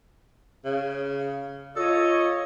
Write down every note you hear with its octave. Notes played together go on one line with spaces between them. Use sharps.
C#3
F4 A4 C#5 D#5